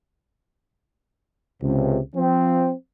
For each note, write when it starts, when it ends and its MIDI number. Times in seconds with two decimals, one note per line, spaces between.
1.62 1.99 37
1.62 1.99 48
2.15 2.72 53
2.15 2.72 60